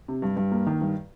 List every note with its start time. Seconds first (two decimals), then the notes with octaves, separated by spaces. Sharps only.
0.08 C3
0.22 G2
0.37 G2
0.51 A#3
0.66 D#3
0.81 G2